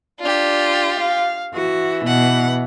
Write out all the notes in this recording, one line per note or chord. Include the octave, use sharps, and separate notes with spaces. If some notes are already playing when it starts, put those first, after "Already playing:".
D4 F4 G4
F5
E3 F#4
B2 F#5